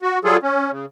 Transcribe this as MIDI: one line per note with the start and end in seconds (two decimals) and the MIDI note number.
0.02 0.19 66
0.24 0.37 54
0.24 0.37 55
0.24 0.37 65
0.24 0.37 68
0.24 0.37 69
0.43 0.71 61
0.71 0.86 49